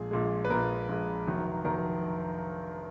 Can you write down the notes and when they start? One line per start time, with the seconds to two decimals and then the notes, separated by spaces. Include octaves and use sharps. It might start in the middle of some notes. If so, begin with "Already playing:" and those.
Already playing: A#1 A#2 G#3 G#4
0.11 A#1 A#2 G#3
0.45 B4
0.50 A#1 A#2 G#3 A#4
0.89 A#1 A#2 G#3
1.26 F1 F2 D#3 F#3
1.65 F1 F2 D#3 F#3 A#4